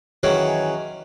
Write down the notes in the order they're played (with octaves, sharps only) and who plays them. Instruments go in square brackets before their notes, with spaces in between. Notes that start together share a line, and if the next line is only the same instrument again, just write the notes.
[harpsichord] D#3 E3 F#3 C#4 F#4 G#4